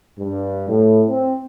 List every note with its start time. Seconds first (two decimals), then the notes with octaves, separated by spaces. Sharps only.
0.20 G2
0.69 A2
1.09 C4